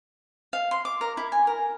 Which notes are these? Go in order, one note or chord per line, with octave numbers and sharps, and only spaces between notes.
F5
C6
D6
A#4
E4
G#5
A#4